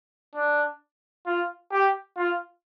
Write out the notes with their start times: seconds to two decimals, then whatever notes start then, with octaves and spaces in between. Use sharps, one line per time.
0.35 D4
1.26 F4
1.72 G4
2.17 F4